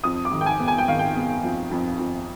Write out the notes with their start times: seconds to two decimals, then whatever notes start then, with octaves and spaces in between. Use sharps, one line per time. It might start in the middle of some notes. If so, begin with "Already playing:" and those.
0.04 F2 D#6
0.25 D6
0.32 D#3
0.41 G5
0.46 G#5
0.59 B3
0.68 G#5
0.78 G5
0.88 D#3 F5
0.99 G5
1.16 B3
1.44 F2
1.71 F2
1.99 F2